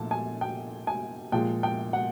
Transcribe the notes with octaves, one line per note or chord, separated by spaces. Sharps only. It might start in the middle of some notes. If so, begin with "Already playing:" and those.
Already playing: A#2 F3 A3 A5
G#5
G5
G#5
A#2 F3 G#3 G5
G5
F#5